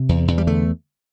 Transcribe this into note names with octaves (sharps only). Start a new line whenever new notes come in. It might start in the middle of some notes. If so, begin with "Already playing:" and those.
Already playing: C3
E2
E2
G3
D3 A3